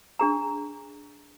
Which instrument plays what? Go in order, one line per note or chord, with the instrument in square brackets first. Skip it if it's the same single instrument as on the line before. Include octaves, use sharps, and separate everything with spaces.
[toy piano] D4 G#4 A#5